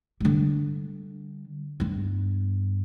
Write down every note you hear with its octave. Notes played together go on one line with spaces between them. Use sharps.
D3 G3
G2 B3